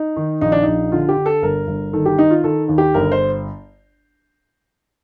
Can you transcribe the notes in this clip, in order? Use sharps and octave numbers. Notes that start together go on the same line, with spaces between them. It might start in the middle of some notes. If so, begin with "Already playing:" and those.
Already playing: D#4
D#3
A#1 D#4
D4
A#1 D#4
D3 F4
G4
D3
A4
G1 A#4
G1
D#3 A4
G4
D#3 D#4
F4
D#3 A4
D#2
G4
G1 A#4
C5